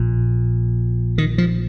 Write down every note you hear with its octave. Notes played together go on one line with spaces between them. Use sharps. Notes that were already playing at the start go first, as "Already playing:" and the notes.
Already playing: A#1 A#2
D#3
F3